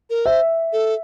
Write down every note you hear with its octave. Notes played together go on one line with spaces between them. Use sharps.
A#4
C5 E5
A4